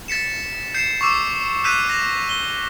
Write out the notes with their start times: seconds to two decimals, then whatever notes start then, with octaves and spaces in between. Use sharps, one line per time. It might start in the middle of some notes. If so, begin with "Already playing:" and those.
0.08 A6 B6 C#7 E7
0.74 G6 C7 C#7 E7
1.01 C#6 D6 E6 E7
1.64 E6 F#6 G6 B6 D#7 F7
1.89 A#6 F7
2.29 G7